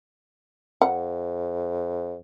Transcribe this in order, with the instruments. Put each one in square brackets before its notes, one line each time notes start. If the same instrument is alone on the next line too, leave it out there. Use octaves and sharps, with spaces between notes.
[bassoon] F2 [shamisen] F#5